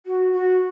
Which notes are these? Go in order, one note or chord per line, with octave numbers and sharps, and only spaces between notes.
F#4
F#4